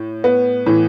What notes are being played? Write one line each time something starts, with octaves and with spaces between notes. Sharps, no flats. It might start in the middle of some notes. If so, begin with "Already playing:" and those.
Already playing: A2
B3
A2 E3